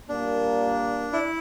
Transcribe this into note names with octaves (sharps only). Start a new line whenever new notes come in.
A#2 G3 A#3 D4
E4